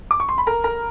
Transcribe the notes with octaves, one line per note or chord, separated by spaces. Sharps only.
D6
C#6
C6
B5
A#4 A#5
A#4 A#5